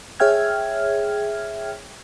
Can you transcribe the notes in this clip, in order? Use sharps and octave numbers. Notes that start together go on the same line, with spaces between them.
G#4 C#5 E5 G5 F6 G#6